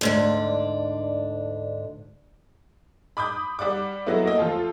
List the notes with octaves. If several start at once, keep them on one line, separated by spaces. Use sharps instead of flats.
D2 G#2 D4
B5 D6 D#6 G6
G3 D5 F#5 D6
F#3 G#3 A3 B3 E4
A#3 D#5
F3 A3 F4 A4